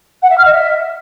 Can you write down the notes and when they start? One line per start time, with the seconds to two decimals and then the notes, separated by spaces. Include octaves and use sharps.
0.22 F#5
0.30 E5
0.38 F6
0.45 D#5
0.53 E5